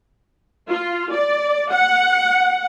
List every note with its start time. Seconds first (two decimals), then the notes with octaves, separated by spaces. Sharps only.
0.69 F4
1.12 D5
1.71 F#5